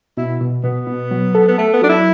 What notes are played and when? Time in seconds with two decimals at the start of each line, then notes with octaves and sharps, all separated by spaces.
0.17 B2 E4
0.41 B2
0.63 B2 B3
0.87 B2
1.11 F#3
1.35 A4
1.48 B3
1.58 A3 A4
1.73 B3
1.82 F#3 D4
1.89 E4